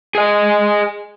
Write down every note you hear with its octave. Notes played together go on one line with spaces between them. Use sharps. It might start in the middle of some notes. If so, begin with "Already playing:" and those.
G#4 D#5